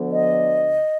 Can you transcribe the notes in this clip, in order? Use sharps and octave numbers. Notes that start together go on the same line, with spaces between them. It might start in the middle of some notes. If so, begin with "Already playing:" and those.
Already playing: D2 D3 F3 B3
D#5